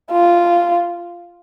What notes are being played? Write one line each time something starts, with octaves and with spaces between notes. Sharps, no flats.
F4